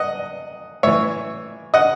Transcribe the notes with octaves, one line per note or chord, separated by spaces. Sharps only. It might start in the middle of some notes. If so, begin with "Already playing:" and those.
Already playing: D#5 F#5
A2 E3 C#5 E5
D#5 F#5